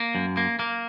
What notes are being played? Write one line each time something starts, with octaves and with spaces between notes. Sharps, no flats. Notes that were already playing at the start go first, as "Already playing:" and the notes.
Already playing: A#3
F#2
A#3
A#3